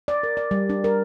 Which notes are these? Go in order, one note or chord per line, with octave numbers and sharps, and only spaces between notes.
D5
A#4
D5
G3
D4
A#4